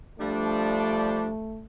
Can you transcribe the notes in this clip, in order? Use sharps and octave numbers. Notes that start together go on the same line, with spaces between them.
F3 G3 A3 D4